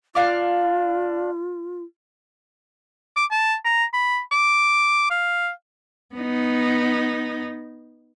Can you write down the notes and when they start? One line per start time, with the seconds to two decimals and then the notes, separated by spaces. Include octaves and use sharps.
0.15 D4 F4 F5 D6
3.16 D6
3.31 A5
3.65 A#5
3.94 B5
4.32 D6
5.10 F5
6.15 B3 D#4